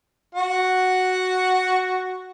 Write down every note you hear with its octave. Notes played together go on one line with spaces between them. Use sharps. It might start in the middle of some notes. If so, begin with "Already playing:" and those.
F#4 F#5